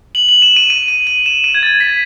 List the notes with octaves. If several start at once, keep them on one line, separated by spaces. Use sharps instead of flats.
F#7
F#7
E7
D#7
D#7
D#7
D#7
E7
D#7
G#6
A6
B6